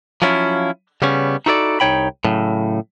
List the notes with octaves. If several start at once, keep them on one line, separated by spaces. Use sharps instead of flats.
F3 F#3 B3 C#4 E4 F4
C#3 G3 B3 C#4
D#4 E4 F#4 A4 C5 D5
C2 D#4 C#5 G5 B5
A2 C#3 F#3